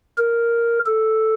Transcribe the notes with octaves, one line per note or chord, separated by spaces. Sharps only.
A#4
A4